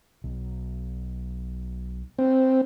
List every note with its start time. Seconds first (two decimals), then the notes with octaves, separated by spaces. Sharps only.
0.24 B1
2.19 C4